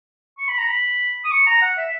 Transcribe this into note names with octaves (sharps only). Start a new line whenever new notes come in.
C#6
B5
A#5
B5
D#6
C#6
A#5
F#5
E5